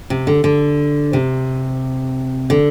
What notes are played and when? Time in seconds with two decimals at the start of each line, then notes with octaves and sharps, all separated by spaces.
0.10 C3
0.27 D3
0.44 D3
1.13 C3
2.50 D3